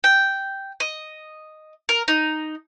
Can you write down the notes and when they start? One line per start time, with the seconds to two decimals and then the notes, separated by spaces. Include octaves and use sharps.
0.04 G5
0.80 D#5
1.89 A#4
2.08 D#4